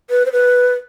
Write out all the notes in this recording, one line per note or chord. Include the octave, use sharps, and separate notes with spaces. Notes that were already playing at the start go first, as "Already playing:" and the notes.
B4
C5
B4